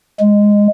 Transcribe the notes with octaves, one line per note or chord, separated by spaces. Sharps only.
G#3